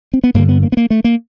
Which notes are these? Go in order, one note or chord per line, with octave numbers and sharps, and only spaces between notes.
C4
B3
G2 D3 A#3
B3
A#3
B3
A#3
A3
A#3